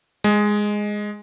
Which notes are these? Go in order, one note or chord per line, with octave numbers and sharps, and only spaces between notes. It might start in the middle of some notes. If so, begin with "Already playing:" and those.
G#3